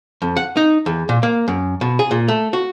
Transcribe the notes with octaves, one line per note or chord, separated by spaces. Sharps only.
F2
F#5
D#4
E2
A#2
A#3
F#2
B2
G#4
A#2
A3
F#4